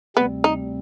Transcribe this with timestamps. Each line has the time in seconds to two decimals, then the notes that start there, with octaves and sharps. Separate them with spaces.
0.16 D2 C3 G3 B3 C4
0.44 D#4